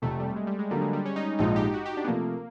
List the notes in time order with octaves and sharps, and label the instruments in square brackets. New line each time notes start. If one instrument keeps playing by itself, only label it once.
[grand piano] F1 F2 C3 [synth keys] A3
[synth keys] G3
G#3
G3
G#3
[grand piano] D3 F#3 A#3 [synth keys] G3
[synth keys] G#3
G3
C#4
D#4
[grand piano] A#1 G#2 F3 G#3 [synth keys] D#4
[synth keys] G4
F#4
G4
D4
B3
[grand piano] C3 F3 A3 [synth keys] A#3